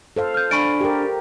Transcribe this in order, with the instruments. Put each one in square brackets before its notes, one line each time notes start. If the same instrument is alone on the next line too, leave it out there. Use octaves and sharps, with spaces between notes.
[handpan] A4 C5 F5
[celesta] F6 G6
[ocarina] D4 [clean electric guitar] D5 G#5 B5 [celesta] C#6 D7
[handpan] G4 A#4